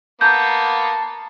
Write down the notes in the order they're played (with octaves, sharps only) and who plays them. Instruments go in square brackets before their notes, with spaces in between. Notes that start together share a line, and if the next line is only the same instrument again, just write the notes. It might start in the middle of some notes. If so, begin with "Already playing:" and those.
[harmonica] A#3 B3 [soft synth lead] A5 [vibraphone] A#5 [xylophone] G6